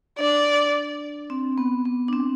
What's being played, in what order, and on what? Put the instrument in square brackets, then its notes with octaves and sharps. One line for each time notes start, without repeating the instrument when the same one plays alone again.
[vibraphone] D4 [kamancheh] D5
[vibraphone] C4
B3
B3
D4
C4